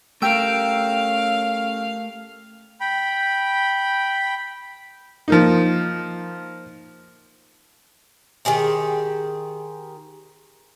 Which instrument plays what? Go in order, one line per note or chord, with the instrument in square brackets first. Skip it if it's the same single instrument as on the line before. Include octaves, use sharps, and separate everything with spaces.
[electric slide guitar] A3 G4 A#4 [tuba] C#4 [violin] F5 [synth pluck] G5 E6 D7
[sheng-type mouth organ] G5 B5
[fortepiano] F3 A#3 D#4
[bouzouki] D#3 G4 G#4 C5